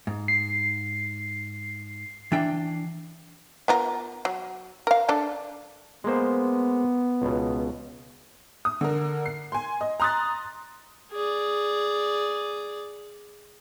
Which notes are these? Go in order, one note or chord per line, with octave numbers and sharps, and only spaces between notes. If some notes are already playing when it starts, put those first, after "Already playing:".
G#2
C7
E3 D4 G5
B3 F4 A#4
F#3
A#4 F5
D4 A4 D5
G#3 A#3 B3 C5
C#2 B2
D#6
D3 A#4
C7
G#5 C6
D#5
A#5 C6 D#6 F#6 A6
G#4 D5